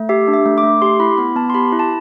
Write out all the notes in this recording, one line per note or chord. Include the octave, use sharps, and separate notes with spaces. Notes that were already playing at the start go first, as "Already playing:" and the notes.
Already playing: A3
G4 E5
D4
E5
A3
D6
A3
G4 C6
E4 B5
B3 B5
B3 A5
C6
G4 B5
E4
A5